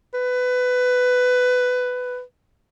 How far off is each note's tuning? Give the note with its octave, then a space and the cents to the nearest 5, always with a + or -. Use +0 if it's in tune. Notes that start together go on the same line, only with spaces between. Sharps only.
B4 +15